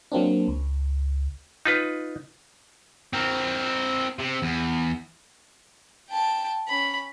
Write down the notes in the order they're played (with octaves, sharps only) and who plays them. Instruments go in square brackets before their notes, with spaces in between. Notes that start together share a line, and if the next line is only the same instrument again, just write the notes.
[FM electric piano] F#3 A#3 C4 D4
C#2
[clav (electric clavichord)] D#4 F4 B4
[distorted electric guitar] C4 A#4
C3
E2
[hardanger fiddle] G5 A5
C#4 B5